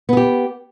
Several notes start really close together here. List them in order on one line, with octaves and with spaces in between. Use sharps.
B3 G#4 G4